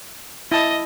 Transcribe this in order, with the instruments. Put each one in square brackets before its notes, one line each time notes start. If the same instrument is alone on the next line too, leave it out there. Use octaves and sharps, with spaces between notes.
[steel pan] E4 A5 [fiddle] D#5